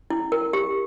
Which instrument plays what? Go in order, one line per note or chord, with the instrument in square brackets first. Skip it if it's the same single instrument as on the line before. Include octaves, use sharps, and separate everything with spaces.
[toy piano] E4
A#4
G4